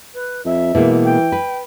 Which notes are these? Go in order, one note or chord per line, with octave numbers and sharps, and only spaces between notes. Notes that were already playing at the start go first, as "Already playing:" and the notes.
B4
F2 E5
B2 E3 G#3 A#3
G5
B4